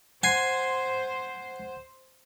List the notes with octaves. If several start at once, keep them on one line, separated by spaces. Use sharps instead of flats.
C5 F#5 G#5 G#6 C7